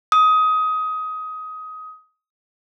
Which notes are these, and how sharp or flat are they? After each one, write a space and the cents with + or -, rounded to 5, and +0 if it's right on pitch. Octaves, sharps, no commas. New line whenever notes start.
D#6 +20